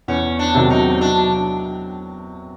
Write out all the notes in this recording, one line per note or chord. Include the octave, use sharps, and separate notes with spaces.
E2 C#4
D4
C3 D#3 F#3
D#4
F#3 D4